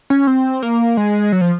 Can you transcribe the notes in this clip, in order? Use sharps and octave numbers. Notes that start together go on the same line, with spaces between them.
C#4
C4
A#3
G#3
F#3
F3